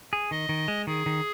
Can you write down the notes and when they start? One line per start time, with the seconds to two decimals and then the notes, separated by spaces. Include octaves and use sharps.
0.13 G#4
0.31 D#3 D#5
0.49 D#3
0.68 G#3
0.87 D#3 G#4
1.06 D#3